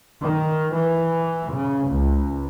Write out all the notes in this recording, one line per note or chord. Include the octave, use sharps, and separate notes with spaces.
D#3
E3
C#3
C#2